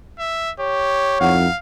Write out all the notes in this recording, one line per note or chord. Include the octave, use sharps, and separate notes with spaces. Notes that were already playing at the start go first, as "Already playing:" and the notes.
E5
G4 C#5
F2 D#4 E4 F5 F#5